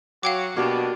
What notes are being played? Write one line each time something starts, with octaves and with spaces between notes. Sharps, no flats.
F#3 F#4 F5 G5 D6
B2 A#3 D4 F#4 G4